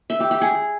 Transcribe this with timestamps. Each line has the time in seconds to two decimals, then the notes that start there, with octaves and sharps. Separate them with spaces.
0.10 E5
0.20 G4
0.31 G4
0.41 G#4